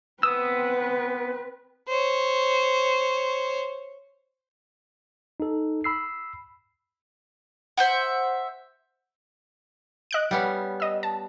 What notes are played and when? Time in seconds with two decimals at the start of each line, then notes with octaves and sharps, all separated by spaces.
0.23 B3 C4 B4 D#6 E6
1.87 C5 C#5
5.40 D#4 A4
5.84 B5 E6 C7
7.77 C5 E5 F#5
10.11 D#5 F#6 D7
10.31 G3 B3 C#4
10.80 D#5 E6
11.03 A5